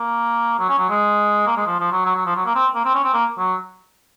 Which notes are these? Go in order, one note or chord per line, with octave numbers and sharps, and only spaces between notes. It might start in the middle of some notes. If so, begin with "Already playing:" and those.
Already playing: A#3
F#3
C#4
F#3
G#3
A#3
G#3
F3
F3
F#3
F#3
F#3
F3
F#3
A#3
C4
A#3
C4
C#4
C4
A#3
F#3